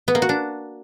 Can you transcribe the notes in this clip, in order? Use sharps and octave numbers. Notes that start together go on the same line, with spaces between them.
B3
A#3
F#4
D4